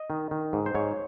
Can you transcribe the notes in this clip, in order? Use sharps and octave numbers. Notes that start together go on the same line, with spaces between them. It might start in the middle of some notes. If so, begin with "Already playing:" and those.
Already playing: D#5
D#3
D#3
G#2
C5
G#2 C#5